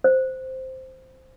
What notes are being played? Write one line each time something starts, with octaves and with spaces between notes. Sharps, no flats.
C5